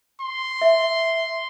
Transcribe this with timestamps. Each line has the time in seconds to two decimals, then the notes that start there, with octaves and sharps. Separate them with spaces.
0.21 C6
0.62 E5